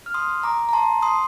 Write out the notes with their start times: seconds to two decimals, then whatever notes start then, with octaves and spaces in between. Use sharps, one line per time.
0.06 F6
0.14 C6 D#6
0.43 A#5 D6
0.69 A#5
0.73 A5 C6
1.02 C6 D#6